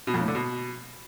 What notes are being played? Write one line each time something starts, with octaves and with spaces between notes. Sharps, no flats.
B2
F2
A2
D3
B2